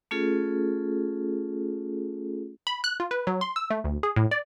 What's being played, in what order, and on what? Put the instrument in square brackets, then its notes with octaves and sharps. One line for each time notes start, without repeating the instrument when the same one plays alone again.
[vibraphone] A3 C#4 F4 G#4 A4
[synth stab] B5
F#6
F4
B4
F#3
C6
E6
A3
D2
G#4
A2
D5